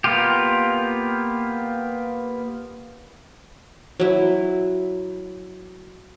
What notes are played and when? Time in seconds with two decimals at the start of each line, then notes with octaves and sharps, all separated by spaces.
0.04 A#3 B3 F4 G4
4.00 F#3 E4